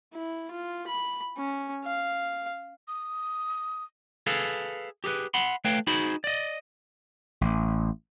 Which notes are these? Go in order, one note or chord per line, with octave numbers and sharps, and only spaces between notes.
E4
F4
B5
C#4
F5
D#6
G#4 A4 B4 F5
G4 G#4 A#4 B4
F#5 B5 C6
A3 B4 C#5 F5 G5
D#4 F#4 G#4 C5 B5
D5 D#5
A1